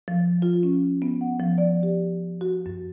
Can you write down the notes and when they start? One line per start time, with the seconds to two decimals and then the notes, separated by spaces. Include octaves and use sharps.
0.08 F3
0.42 F4
0.63 C#4
1.02 B3
1.21 F#5
1.40 F3
1.58 D5
1.83 G4
2.41 F#4
2.66 F#2